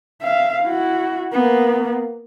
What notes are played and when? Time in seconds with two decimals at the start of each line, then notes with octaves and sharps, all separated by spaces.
0.22 E5 F5
0.63 E4 F#4
1.32 A#3 B3